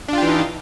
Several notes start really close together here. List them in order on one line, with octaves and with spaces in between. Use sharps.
D4 F4 G4 E3 D#4